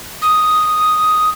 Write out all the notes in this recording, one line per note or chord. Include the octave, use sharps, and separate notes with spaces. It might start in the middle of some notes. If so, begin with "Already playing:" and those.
D#6